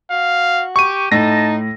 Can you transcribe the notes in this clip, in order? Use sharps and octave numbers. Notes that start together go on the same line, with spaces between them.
F#4 F5
G4 C#6 D#7
A2 D#4 A5 A#6